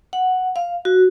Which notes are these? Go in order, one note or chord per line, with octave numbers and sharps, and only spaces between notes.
F#5
F5
F#4